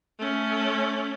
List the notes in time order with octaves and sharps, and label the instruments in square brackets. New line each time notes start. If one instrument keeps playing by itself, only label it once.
[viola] A3 C#4